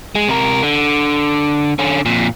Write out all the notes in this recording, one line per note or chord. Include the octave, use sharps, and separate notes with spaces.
G#3
C3 A#4
D3
D3 C#4
F2 A#2